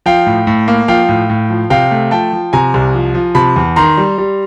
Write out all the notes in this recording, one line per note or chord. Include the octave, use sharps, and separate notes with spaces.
F3 F5 G5
A2
A2
A#3
F3 F5 G5
A2
A2
F3
C3 F5 G5
A3
F3 G5 A5
F3
C3 G#5 A#5
C2
F3
F3
C3 A5 B5
E2
D#3 A#5 C6
G3
G3